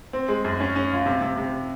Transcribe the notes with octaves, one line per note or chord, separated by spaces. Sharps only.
C4
G#3
F#2
C#4
C#4
F4
C3
C3
C3